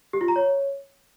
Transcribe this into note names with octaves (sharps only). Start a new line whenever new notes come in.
G4
F4
A#5
C#5